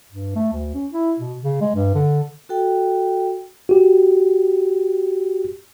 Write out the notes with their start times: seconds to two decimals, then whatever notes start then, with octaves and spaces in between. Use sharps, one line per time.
0.12 G2
0.35 A3
0.53 D2
0.74 C#4
0.93 E4
1.19 B2
1.43 C#3
1.61 G#3
1.75 G2
1.95 D3
2.49 F#4 A4 G5
3.69 F#4 G4